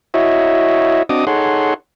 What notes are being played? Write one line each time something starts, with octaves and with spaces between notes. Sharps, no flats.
E4 F#4 C#5 D#5 E5
C4 D4 F#4 D#5 D6 D#6
D#4 G#4 A4 C#5 F#5 C6